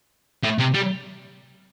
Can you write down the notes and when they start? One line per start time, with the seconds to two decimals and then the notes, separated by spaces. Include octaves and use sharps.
0.44 A2
0.59 C3
0.75 G3